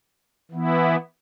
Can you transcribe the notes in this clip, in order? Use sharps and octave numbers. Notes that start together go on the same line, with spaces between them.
E3 B3 E4